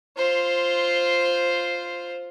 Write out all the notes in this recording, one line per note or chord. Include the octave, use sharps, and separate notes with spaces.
F4 C5